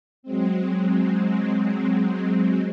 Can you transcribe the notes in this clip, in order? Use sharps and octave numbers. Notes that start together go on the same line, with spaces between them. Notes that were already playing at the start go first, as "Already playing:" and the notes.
F#3 G#3 C4